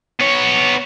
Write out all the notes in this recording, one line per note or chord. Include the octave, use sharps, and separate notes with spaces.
B3 C#5